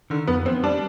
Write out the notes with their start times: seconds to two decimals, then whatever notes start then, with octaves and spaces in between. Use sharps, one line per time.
0.10 D3 D#3
0.28 F2 B3
0.45 B3 C4
0.63 G3 D4